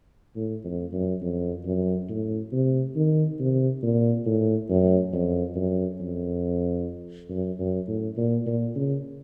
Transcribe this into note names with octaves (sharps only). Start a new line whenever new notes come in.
A2
F2
F#2
F2
F#2
A2
C3
D#3
C3
A#2
A2
F#2
F2
F#2
F2
F#2
F#2
A2
A#2
A#2
C#3